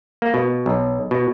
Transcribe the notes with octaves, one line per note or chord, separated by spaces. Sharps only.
A#3
B2
B1
B2